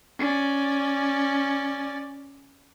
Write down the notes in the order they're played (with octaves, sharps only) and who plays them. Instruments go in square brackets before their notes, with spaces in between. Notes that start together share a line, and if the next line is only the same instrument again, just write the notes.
[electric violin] C#4 D5